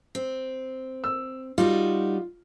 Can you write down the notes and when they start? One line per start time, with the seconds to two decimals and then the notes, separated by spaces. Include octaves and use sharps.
0.15 C4
1.04 E6
1.58 G3 D#4 F4 F#4